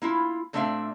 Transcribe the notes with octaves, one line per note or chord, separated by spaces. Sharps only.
A#3 E4 F4
A#2 A3 C4 D4 E5 F5